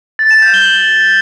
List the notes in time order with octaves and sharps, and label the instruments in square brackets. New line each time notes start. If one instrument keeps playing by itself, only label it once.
[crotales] A6
E7
G6
G7
F#7